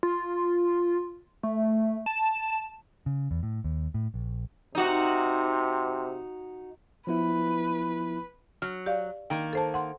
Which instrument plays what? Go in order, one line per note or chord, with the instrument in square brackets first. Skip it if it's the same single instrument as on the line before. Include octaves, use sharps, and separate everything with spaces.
[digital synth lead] F4
A3
A5
[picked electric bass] C#3
E2
A2
D#2
A2
A#1
[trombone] C3 [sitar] D#4 F#4
[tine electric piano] F3 B3 E4 [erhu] B4
[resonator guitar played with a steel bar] F#3 [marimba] F6
[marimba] G4 D5 F5
[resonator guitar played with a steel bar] D#3 A#3 [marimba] G5
[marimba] A4 C5 A5
F#5 C6